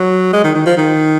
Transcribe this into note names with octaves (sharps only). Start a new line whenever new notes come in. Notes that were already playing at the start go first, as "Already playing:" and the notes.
Already playing: F#3
G#3
D#3
D#3
F3
D#3